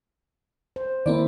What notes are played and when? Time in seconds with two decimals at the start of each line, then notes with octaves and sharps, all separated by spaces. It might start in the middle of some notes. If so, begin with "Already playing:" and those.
0.76 C5
1.06 D#3 A#3 C4 E4 D5